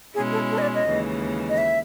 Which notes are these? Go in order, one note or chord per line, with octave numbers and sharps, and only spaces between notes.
B2 G#3 C#4 E4 G#4
A4
A4
D#5
D5
D#5
D#2 C#3 E3 G#3
D#5
E5